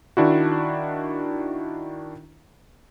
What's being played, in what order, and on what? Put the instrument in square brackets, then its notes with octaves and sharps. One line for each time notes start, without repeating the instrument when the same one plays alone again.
[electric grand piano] D#3 D4 E4 F#4